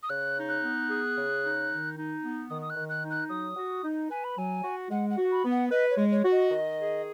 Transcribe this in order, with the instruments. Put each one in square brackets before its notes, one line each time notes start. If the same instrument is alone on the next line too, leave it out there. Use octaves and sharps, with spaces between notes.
[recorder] D#6
[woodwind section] C#3 [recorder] F#6
[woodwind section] D#4
[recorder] F#6
[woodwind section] B3
G#4
C#3
D#4
D#3
D#4
B3
[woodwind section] D#3 [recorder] D#6
[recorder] D#6
F#6
[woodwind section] D#3
[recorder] F#6
[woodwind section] D#4
[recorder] F#6
[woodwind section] F#3 [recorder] D#6
[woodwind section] F#4
D#4
[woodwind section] B4 [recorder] G#5
[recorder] B5
[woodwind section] F#3 [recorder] G#5
[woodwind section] F#4
[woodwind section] G#3 [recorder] F#5
[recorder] F#5
[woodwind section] F#4
[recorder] B5
[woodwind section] B3
[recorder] F#5
[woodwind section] B4 [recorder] D#5
[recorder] C#5
[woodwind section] G#3
[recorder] C#5
[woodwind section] F#4
[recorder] D#5
[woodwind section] D#3
G#4